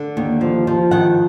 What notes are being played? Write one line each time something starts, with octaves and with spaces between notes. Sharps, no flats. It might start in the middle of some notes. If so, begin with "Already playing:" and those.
Already playing: D3
D#2
F3
F3
D#3 F#5